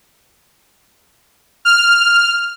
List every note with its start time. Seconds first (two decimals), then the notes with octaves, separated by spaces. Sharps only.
1.65 F6